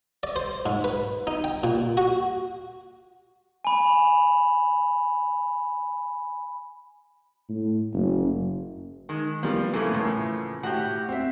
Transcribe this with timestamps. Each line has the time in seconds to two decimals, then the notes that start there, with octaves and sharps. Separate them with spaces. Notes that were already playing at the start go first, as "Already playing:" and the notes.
0.23 D5
0.36 C5
0.66 G#2
0.84 B4
1.27 D#4
1.44 G5
1.63 A#2
1.97 F#4
3.65 G#5 B5
7.49 A2
7.93 F#1
9.09 D#3 G#3
9.43 E3 F3 G3 A#3
9.73 C#3 E3 F3 A3 A#3
9.93 A2
10.63 A2 F#4 G4
11.09 C4 E5